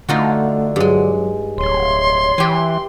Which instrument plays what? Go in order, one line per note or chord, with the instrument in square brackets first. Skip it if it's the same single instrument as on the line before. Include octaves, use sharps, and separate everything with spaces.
[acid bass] D3 [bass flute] A3 [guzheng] D#4 F4 F#4
[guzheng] G2 G#3 [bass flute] F#3
[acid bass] D1 [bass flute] C#5 [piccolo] C6
[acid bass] E3 [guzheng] G4 G#5